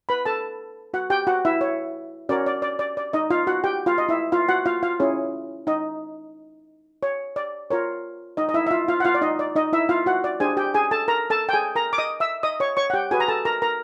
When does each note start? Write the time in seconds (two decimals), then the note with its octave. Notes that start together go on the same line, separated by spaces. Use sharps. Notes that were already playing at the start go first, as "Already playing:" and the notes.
0.09 B4 B5
0.26 A4 A5
0.94 F#4 F#5
1.10 G4 G5
1.27 F#4 F#5
1.45 E4 E5
1.61 C#5
2.29 C#4 F#4 A#4 C#5 D5
2.46 D5
2.62 D5
2.79 D5
2.97 D5
3.13 D#4 D#5
3.30 F4 F5
3.47 F#4 F#5
3.64 G4 G5
3.86 F4 F5
3.98 D#5
4.09 E4 E5
4.32 F4 F5
4.49 F#4 F#5
4.66 F4 F5
4.83 F4 F5
5.00 C#4 E4 G#4 C#5
5.67 D#4 D#5
7.03 C#5
7.36 D5
7.71 F4 A#4 C#5
8.37 D#4 D#5
8.49 D#5
8.54 E4 E5
8.67 E5
8.71 F4 F5
8.88 F4 F5
9.00 F#5
9.05 F4 F5
9.15 D5
9.22 D#4 D#5
9.39 D5
9.56 D#4 D#5
9.73 E4 E5
9.89 F4 F5
10.06 F#4 F#5
10.24 D5
10.40 D4 G4 G#4 C5 G#5
10.57 G4 G5
10.74 G#4 G#5
10.91 A4 A5
11.08 A#4 A#5
11.30 A4 A5
11.49 G5
11.53 G#4 G#5
11.76 A#4 A#5
11.93 D6
11.98 D#5 D#6
12.20 E5 E6
12.43 D#5 D#6
12.60 C#5 C#6
12.77 C#5 C#6
12.90 F#5
12.94 G4 G5
13.11 F#4 G#4 B4 G#5
13.20 A#5
13.28 A4 A5
13.45 A#4 A#5
13.62 A#4 A#5